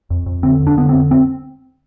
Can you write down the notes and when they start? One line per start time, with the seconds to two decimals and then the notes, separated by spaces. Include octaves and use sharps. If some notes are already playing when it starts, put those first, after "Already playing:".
0.10 F2
0.26 F2
0.43 D3 C4
0.61 F2
0.67 D4
0.77 D3 B3
0.89 C4
0.94 F2
1.11 C4